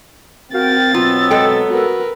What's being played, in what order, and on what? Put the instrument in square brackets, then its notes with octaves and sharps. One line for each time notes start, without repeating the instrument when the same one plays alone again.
[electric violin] C4 A6 [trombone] F#4 [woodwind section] A#4 F5 G5
[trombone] B2 [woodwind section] F#3 B3 E6 [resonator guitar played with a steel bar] F4
[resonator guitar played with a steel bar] G#3 A4 G5
[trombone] F#4 [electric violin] A#4 B4